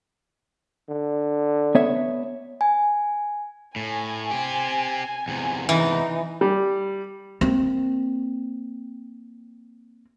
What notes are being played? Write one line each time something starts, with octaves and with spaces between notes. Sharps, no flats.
D3
B3 C#5 E5
G#5
A2 G#5
C4 G4
E2 C3
E3 D#4
G3
A#3 C4